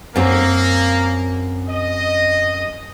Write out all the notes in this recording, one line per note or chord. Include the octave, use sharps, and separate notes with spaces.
F#2 A#3 C4
D#5